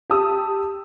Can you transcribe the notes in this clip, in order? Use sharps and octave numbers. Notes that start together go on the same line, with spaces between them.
G4 A5 D#6 E6